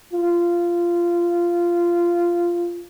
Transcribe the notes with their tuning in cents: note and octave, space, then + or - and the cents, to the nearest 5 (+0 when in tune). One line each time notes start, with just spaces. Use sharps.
F4 -15